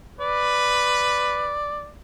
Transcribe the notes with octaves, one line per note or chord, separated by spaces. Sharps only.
B4 D5